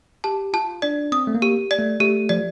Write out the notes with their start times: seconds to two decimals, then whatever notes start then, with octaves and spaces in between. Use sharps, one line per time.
0.24 G4 A5
0.53 F4 A5
0.82 D4 D5
1.12 C4 D#6
1.27 A3
1.35 A#3
1.42 G4
1.71 D5
1.79 A3
2.00 A3 G4
2.29 F3 D5